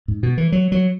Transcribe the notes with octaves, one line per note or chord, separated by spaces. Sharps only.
G#2
B2
E3
F#3
F#3